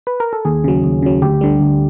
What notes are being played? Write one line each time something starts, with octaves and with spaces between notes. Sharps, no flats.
B4
A#4
A4
D#2 G#4
C#3 F#3
D#2
C#3 F#3
D2 G4
D3 G3
D2